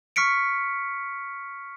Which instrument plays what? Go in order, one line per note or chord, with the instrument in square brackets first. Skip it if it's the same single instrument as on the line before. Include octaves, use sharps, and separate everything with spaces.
[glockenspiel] C#6 F6 B6 C#7 D7